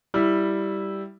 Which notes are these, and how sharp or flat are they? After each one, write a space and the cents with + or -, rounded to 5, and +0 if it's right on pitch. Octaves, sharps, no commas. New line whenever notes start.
G3 +0 E4 +0